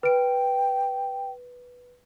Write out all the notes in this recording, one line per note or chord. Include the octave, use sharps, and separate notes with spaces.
B4 G5 D7